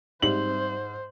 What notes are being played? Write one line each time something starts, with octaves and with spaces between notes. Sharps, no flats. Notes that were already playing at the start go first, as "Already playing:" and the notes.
G#2 G3 C4 C5 E5 F#7